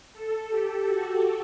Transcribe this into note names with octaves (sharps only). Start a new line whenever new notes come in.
A4
G4
F#4